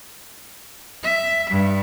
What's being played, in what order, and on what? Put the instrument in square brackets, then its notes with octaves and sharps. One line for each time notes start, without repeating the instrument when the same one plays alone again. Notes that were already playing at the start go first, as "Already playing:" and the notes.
[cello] E5
G2